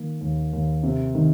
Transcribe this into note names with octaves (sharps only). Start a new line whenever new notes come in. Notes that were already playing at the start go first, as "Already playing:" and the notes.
Already playing: D#3 A#3
D#2
D#2
C3
D#3